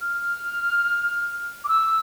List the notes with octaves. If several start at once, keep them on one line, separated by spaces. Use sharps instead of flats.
F6
D6
E6